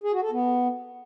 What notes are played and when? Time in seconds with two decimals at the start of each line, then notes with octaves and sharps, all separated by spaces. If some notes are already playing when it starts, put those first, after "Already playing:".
0.03 G#4
0.13 F#4
0.22 A4
0.31 B3